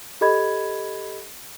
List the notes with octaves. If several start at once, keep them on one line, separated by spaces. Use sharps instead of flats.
G4 A4 D#5 B5 G#6